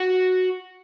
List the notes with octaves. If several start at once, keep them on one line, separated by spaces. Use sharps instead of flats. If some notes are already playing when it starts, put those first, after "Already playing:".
Already playing: F#4